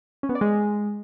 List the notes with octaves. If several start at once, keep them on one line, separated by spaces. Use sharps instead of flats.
C#4
B3
D5
G#3